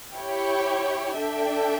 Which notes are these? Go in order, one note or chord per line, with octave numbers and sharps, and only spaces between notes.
E4 G4 C#5 G5
D4 A4 E5 G5